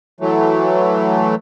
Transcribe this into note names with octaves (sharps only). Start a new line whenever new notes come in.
E3 F#3 A3